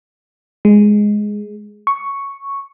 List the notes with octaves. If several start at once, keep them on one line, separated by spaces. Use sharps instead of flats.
G#3
C#6